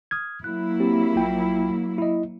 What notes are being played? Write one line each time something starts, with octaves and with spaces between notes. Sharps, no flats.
D#6 F6 G#6
F#3 A#3 E4 F#6
C4 G4
A#1 F4 G5
E4 D#5